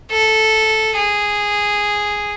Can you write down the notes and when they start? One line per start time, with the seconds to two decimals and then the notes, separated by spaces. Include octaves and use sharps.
0.11 A4
0.97 G#4